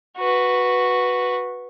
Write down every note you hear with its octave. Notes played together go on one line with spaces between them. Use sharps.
F#4 B4